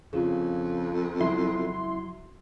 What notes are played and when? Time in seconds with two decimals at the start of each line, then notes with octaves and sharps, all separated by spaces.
0.13 F2 C#3 F4 G#4
1.20 C#2 F#3 E4 C6